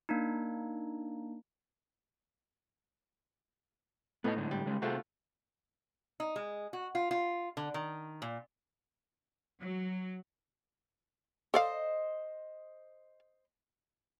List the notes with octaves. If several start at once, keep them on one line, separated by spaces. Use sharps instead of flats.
A#3 D4 D#4
A2 B3 D#4 B4 D#5
G#2 D3
G3
C#3 G#3
C3 A3 F4 F#4 G#4 C5
D#4
G#3
F#4
F4
F4
D3
D#3
A#2
F#3
A4 C5 D5 D#5 F5